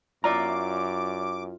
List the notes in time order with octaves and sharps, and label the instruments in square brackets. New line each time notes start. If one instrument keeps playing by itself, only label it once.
[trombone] F#2 [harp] E4 F4 [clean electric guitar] D5 A#5 [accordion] D6